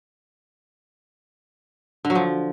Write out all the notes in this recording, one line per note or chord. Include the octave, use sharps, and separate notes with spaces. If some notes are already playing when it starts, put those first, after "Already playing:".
D3
F#3
F3